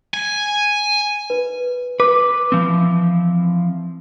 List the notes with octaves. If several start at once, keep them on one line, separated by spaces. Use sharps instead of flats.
G#5
B4
B4 D6
E3 F3 C4